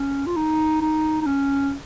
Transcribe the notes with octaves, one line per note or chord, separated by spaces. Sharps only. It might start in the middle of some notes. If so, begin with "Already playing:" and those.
Already playing: C#4
F4
D#4
D#4
D#4
C#4